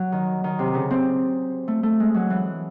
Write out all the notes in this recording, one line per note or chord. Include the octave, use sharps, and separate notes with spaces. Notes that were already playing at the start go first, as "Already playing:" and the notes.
Already playing: F#3
D#3
D#3
C3
C#3
C4
A3
A3
G#3
F#3
E3